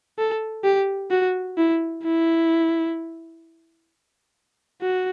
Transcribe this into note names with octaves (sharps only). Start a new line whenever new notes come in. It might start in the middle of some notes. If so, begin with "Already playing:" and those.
A4
G4
F#4
E4
E4
F#4